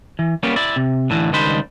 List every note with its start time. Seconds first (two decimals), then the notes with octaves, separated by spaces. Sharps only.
0.19 E3
0.43 G3 A#3 B3 C#4
0.56 E4 D5
0.76 C3
1.10 A2 D3 E3
1.33 C#2 D#3 G3 D4 C5 B5